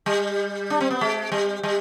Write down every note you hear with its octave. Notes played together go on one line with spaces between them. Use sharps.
G3
D4
C4
B3
G#3
G3
G3